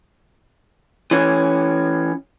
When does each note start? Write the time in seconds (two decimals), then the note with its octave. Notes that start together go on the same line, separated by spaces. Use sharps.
1.11 E3 C#4